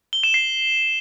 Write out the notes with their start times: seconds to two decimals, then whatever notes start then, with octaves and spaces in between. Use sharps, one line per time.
0.13 G7
0.23 E7
0.34 C7